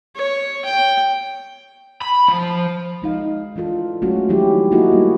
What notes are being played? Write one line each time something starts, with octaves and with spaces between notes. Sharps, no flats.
C#5
G5
B5
F3
G#3 D#4 F5
E3 D4 F4 A4
F#3 G#3 A3 C#4 F#4
D#3 F3 F#3 C#4 E4 G4
A#3 D#4 E4 F#4 G#4
G3 A3